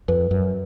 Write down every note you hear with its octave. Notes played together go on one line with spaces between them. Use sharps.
F2 B4
F#2